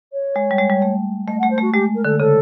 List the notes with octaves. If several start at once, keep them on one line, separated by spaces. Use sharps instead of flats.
C#5
G#3
G3
G#3
G3
A3
A3 D#5
F#5
A3
C5
A3 F#4
G#3 G4
A#4
D3 A4
C#3 A4